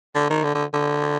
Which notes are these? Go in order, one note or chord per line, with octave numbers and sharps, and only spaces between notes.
D3
D#3
D3
D3
D3